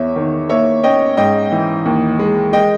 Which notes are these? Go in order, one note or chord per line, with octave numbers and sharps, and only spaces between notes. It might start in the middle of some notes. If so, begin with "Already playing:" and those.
Already playing: E2 C#5 E5
D#3
A#3 C#5 E5
C#4 D#5 G5
G#2 D#5 G5
E3
D#2
G#3
G#3 D#5 G5